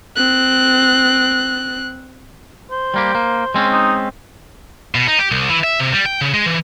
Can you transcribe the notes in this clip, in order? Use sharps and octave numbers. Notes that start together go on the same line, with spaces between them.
C4 F#6
C5
G3 A#3 G4
A#3
G#3 C4 C#4
D#4
B2
D#4
G4
C2
E3
E5
C3
G3
G5
C#3
G#3
E3